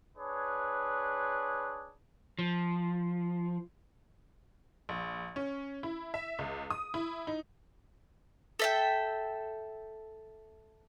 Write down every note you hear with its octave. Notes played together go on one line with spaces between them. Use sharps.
D4 G#4 B4 C#5
F3
A#1
C#4
E4
E5
C#2
D#6
E4
D#4
A4 E5 G5